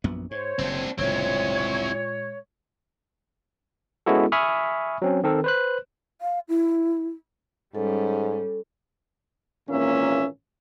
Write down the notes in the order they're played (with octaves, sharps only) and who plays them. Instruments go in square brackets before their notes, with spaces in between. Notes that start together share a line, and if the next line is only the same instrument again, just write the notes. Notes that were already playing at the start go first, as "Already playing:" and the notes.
[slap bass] A#1 F#2 B3
[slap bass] G#2 [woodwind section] C5 C#5
[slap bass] F#1 F#2 [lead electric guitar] C4 D4
[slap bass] F#1 D2 D3 [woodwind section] A#2 G#3 C#5 [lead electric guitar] C4 E4
[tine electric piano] G#3 B3 C#4 E4 F#4 A4
E5 G#5 B5 C#6 D#6 F6
F#3 C4 C#4
D#3 C4 A4 A#4
B4 C5 F#6
[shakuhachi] F5
E4
[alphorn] G#2 [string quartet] G3 C#4 [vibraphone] A4
[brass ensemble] G#1 A#2 E3 A#3 C#4 E5